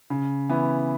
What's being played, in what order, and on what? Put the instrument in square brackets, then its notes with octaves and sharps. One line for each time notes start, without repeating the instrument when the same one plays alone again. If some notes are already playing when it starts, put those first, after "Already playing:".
[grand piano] C#3
E3 B3 E4